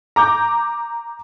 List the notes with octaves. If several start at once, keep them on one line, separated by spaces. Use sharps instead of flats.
A#5 D6 G6